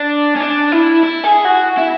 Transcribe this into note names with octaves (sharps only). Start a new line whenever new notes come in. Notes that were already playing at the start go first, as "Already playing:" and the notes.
Already playing: D4
C#4
D4
E4
E4
G#4
F#4
E4